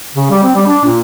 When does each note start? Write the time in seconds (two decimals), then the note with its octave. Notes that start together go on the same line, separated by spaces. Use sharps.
0.15 C#3
0.30 G3
0.43 C4
0.55 G3
0.67 D4
0.85 A#2